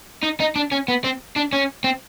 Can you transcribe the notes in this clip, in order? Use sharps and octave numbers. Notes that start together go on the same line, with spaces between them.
D#4
D#4
D4
C#4
B3
C4
D4
C#4
C4